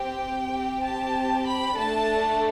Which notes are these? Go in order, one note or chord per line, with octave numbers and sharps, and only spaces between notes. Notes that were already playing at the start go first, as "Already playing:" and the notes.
Already playing: C4 G4 G5
C4 G4
A5
B5
A3 D4 A4 A5